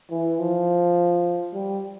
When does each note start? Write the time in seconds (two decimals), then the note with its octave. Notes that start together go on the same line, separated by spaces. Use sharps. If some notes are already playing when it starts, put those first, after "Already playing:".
0.11 E3
0.39 F3
1.53 G3